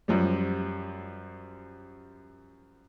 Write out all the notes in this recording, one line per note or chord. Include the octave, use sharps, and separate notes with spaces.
F#2 F3 G3